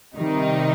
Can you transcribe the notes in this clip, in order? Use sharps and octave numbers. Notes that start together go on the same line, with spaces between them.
C3 D#3 G3 D#4